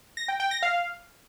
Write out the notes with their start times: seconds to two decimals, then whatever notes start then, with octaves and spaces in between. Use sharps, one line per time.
0.17 A#6
0.28 G5
0.40 G5
0.51 A#6
0.63 F5